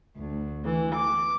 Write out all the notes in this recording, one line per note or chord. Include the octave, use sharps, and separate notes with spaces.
D2
E3
D6